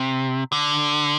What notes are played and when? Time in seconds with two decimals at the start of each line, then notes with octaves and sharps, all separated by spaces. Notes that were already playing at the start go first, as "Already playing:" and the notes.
Already playing: C3
0.52 D3